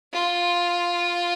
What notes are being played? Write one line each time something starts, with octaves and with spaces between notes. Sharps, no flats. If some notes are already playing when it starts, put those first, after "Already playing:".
F4